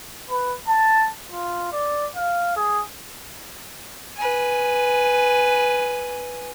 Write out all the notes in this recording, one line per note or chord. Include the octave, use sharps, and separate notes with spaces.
B4
A5
F4
D5
F5
G#4
B4 G#5